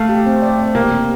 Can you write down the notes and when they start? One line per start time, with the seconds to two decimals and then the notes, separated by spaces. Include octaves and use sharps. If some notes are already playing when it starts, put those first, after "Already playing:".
Already playing: A3 F5
0.09 G4
0.26 C4
0.42 D5
0.58 C4
0.75 C3 A#3
0.91 C3